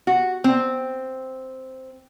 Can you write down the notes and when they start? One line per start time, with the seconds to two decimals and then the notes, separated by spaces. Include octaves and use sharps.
0.07 F#4
0.44 C4